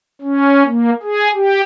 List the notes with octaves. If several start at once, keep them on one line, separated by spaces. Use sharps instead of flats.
C#4
A#3
G#4
G4